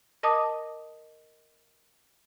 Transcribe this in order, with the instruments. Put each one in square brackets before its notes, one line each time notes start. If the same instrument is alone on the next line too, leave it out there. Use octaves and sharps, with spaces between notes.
[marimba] A#4 D#5 A5 D6 D#6